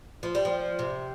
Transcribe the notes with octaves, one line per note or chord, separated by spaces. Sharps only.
F3
G3
F3
C3